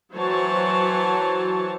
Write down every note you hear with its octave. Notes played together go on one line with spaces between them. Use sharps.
E3 F#3 F#4 C5 C#5 A5